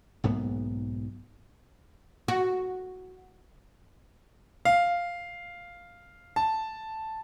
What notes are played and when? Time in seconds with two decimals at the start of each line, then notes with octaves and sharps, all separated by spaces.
0.24 B1 G#2 A#3 B3
2.28 F#4
4.65 F5
6.36 A5